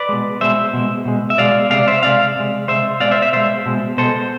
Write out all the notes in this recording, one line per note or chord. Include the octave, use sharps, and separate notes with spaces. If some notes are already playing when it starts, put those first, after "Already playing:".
Already playing: B4 D5
B2 G#3
B2 G#3 C5 E5
B2 G#3
B2 G#3
E5
B2 G#3 D5 F5
C3 G#3 D5 F5
C5 E5
C3 G#3 D5 F5
C3 G#3
C3 G#3 C5 E5
B2 G#3 D5 F5
C5 E5
C5 E5
B2 G#3 C5 E5
B2 G#3
B2 G#3 A4 C5